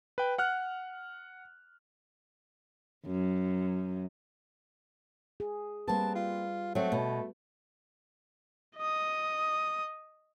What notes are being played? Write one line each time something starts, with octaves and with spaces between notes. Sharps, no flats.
B4 G5
F#5 F6 F#6
F#2
G#4
G3 A#3 C4 B4 A5
F4
F#3 A3 C4
B2
D#5 D#6